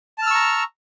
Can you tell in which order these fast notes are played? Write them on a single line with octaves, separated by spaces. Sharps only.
A5 F6 E6 C#6 A#5